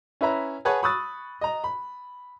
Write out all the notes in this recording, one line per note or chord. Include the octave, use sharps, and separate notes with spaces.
C#4 E4 B4 E5 A#5
G#4 B4 C#5 F#5 G#5 A5
B5 C#6 D#6 E6 F#6 A6
D#5 A#5
B5